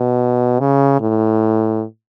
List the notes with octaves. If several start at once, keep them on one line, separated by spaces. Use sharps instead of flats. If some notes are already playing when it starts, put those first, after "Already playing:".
Already playing: B2
C#3
A2